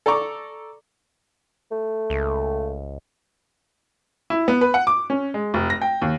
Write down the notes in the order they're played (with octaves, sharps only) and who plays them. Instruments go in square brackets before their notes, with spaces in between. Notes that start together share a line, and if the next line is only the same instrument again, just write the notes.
[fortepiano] A4 D5 A#5 C#6 D6
[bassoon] A3
[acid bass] C#2
[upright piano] E4
B3
B4
F#5
D6
C#4
G#3
F1
A#6
G5
D#2